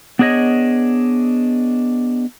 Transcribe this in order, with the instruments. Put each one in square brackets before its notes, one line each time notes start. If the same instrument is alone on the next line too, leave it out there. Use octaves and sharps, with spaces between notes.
[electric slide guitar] B3 D4 G#4 C#5 D#5